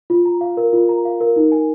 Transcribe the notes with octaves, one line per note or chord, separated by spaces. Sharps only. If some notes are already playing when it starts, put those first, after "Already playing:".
F4
A#5
F5
A#4
F4
A#5
F5
A#4
D#4
G#5